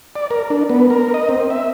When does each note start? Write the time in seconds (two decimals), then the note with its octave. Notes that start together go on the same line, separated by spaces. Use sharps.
0.16 D5
0.31 A#4
0.50 D4
0.69 B3
0.90 A#4
1.14 D#5
1.29 C4
1.50 E5